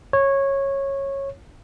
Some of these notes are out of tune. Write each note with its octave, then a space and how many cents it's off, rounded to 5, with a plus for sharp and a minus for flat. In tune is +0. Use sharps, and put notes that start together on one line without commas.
C#5 -15